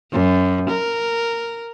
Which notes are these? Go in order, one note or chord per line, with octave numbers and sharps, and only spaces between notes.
F#2
A#4